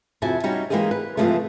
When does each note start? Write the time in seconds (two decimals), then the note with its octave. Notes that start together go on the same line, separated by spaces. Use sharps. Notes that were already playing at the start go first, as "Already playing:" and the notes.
0.22 F2 C3 E4 F#4 G#5 A5
0.44 G3 C#4 D#4 F#4
0.70 E3 G#3 A#3 D#4 G4 G#4
0.91 B4
1.17 G2 C3 E3 F3 G#3 A3